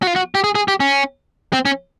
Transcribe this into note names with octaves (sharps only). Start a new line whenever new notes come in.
F#4
F4
F#4
G4
G#4
G#4
G4
C#4
C4
C#4